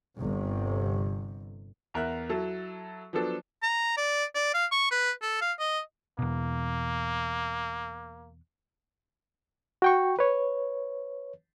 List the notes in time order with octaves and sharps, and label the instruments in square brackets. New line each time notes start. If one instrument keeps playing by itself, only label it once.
[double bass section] G1 C3
[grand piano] E2 A#4 E5 F#6
F#3 E4 A4
F3 F#3 B3 D4 A4
[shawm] A#5
D5
D5
F5
C#6
B4
A4
F5
D#5
[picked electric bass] E2 B2 [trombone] A#3
[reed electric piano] F#4 G5 C#6
B4 C#5